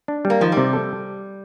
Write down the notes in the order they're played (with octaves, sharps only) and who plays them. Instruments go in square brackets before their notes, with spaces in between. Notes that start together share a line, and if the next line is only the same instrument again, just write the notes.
[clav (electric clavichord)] D4
G3
[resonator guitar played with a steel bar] A#3
[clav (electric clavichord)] D#3 [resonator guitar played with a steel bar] F3
[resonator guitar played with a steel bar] G3
[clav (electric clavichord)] C3
A4